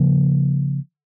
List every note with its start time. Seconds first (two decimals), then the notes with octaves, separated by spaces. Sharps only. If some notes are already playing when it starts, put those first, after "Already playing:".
Already playing: C#3 F3 A#3